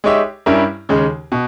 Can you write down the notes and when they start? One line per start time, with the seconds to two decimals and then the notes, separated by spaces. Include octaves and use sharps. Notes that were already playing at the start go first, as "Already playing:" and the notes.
0.04 G#3 D#4 G4 C#5 E5
0.46 G2 G3 C#4 E4 A#4
0.89 D#2 C#3 G#3
1.32 B2